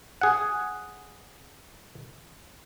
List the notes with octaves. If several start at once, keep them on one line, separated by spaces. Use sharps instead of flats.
G#4 F#5